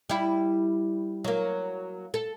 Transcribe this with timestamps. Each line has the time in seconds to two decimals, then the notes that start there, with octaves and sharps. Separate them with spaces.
0.09 G3 E4
1.24 F#3 A#3
2.14 A4